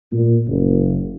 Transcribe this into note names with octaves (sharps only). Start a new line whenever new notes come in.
A#2
F#1